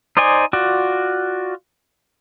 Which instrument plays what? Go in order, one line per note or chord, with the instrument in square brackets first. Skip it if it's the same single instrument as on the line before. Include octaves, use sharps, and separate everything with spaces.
[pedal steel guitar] D#4 C5 D5 D#5 G#5
F4 F#4 D5